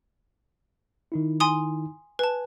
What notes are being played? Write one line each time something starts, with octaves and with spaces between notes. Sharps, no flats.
D#3 D#4 E4
G#5 C6 D#6
B4 G#5 A5